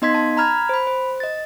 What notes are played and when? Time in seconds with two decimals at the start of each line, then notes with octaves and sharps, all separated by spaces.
0.02 B3 D#4 D#5 C6 G#6 B6
0.14 A5
0.37 A#5 B5 F6 G#6
0.69 C5 B5
0.87 C5
1.20 D#5 A6